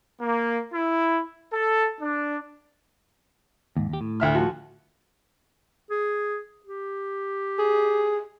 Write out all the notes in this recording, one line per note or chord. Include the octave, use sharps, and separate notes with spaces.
A#3
E4
A4
D4
D#2 G#2
D#2 G4
A2
D2 E5 F6
F3 F#4
G#4
G4
G#4